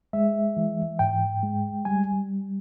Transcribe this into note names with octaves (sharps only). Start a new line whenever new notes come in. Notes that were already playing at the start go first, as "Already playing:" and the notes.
G#3 E5
E3
G#2 G5
G#3
G3 G#5